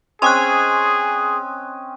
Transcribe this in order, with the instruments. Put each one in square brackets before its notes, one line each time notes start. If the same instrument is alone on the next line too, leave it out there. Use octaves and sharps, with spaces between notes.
[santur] C4 C#4 D#5 [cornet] G#4 [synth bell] C6 D#6 F#6